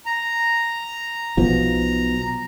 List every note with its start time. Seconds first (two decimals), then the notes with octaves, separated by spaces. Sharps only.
0.06 A#5
1.37 B1 B2 F3